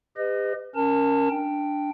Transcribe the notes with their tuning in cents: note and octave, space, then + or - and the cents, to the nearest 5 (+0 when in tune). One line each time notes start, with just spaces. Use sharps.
G4 +40 B4 +40 D#5 -10
C#4 +0 A#4 +0 A5 +30
D4 +0 G5 +0